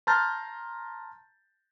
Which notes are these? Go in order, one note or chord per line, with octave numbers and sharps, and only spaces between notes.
A5 A#5 C6 F6 G6 A6